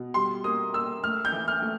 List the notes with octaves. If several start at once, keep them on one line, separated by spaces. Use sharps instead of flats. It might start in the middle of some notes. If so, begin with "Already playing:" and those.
Already playing: B2
G3 C6
A#3 D#6
A#3 E6
A3 F6
G6
E3
F6
A3